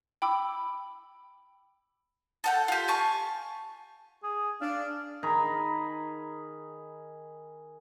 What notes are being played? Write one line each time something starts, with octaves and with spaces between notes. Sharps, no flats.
G5 B5 D6 E6
A4 F#5 G5
F4 G4
G#5 A5 C#6
G#4
D4 F5
D#3 G#4 A#5 B5